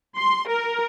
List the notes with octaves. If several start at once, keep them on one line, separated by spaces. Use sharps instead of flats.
C6
A#4